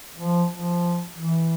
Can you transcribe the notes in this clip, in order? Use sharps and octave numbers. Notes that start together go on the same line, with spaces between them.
F3
F3
E3